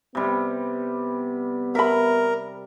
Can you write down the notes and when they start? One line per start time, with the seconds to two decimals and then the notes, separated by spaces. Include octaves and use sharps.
0.15 C3 G3 B3
1.75 A#4 E5 B5